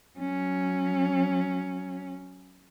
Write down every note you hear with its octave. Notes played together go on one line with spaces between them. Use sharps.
F#3 C#4